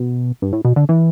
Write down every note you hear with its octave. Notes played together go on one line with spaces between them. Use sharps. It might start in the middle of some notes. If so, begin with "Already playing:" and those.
Already playing: B2
G2
A2
B2
D3
E3